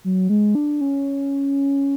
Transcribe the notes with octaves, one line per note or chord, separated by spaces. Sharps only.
F#3
G#3
D4
C#4